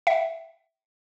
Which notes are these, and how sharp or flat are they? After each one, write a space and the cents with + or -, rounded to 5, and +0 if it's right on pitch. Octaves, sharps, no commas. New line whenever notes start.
E5 +0 G5 -40